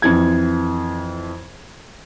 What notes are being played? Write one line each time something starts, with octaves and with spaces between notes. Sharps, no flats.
F2 E3 G#6